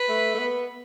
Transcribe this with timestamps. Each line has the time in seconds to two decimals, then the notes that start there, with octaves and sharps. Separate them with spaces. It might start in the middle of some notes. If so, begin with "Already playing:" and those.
Already playing: B4
0.09 A3
0.35 A3
0.39 B3